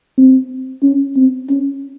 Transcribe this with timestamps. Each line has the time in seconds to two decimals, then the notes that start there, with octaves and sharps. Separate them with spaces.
0.18 C4
0.83 C#4
1.16 C4
1.49 C#4